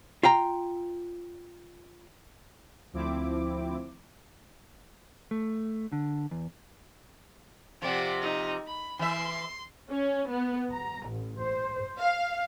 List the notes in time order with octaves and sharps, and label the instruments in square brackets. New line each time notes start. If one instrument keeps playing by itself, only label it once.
[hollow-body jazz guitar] F4 F5 G5 A#5
[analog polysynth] D2 F3 C4 E4 D6
[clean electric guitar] A3
D3
E2
[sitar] C3 F3 [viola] D5 F#5
[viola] D#4
B5
[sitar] E3 E5 [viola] C6
[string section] C#4
B3
A#5
A1
C5
F5